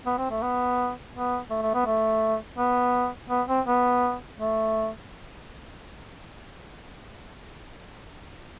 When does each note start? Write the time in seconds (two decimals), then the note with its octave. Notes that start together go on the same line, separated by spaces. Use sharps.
0.06 B3
0.18 C4
0.30 A3
0.42 B3
1.14 B3
1.50 A3
1.62 A3
1.74 B3
1.86 A3
2.58 B3
3.30 B3
3.48 C4
3.66 B3
4.38 A3